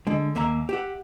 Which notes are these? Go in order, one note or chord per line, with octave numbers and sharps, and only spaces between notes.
D3 G#3
D#2 A#3 E5 F5 A#5
G4 E5 F#5